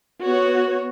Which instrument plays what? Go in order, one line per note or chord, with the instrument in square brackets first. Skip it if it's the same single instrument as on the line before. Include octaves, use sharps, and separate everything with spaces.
[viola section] B3 F#4 C#5